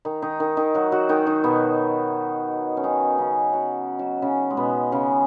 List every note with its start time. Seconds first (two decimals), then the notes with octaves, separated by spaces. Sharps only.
0.05 D#3 D#4
0.22 D#3 D#4
0.40 D#3 D#4
0.57 D#3 D#4
0.74 F#3 F#4
0.92 F#3 F#4
1.09 D#3 D#4
1.26 D#3 D#4
1.44 B2 B3
2.77 C#4
2.83 D#3 D#4
3.18 C#3 C#4
3.53 F#3 F#4
3.99 F#3 F#4
4.22 C#3 C#4
4.50 G#3
4.57 B2 B3
4.92 C#3 C#4